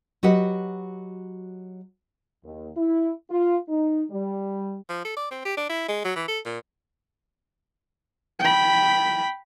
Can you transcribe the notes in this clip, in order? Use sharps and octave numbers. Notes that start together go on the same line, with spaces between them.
F#3 F#4 G4 B4 D#5 F#5
D#2
E4
F4
D#4
G3
F3
A4
D5
C4
G4
D4
E4
G#3
F#3
E3
A4
A#2
G5 B5